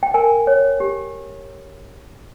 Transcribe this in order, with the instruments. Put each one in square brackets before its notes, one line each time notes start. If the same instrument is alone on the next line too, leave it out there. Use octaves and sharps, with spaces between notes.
[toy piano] G5
A#4 G#5
C#5
G4